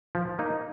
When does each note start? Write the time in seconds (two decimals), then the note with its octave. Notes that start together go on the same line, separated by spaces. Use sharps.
0.15 F3
0.39 A#3 D#4